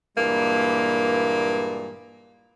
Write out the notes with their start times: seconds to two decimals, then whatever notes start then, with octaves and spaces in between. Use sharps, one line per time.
0.16 G2 A#2 E3 G#3 A#3